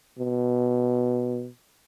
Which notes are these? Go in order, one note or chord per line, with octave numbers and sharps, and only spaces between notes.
B2